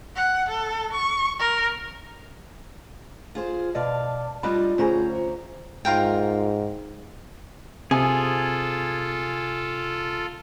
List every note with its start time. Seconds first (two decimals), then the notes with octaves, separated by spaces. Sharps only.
0.16 F#5
0.49 A4
0.92 C#6
1.39 A#4
3.35 F4 G#4 C5
3.75 B2 D5 D#5 F5 A5
4.43 G3 D4 D#4 F4 B4 D#5 B5
4.78 D2 C#4 G#4 C5 A#5
5.85 G#2 F4 A#4 G5
7.91 C3 F4 G#4 A4 G#5 D#6